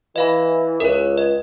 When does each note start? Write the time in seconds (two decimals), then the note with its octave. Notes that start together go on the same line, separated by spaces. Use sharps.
0.16 E3 D#5 F5 B5
0.80 C#2 A#4 C#5
1.17 D#5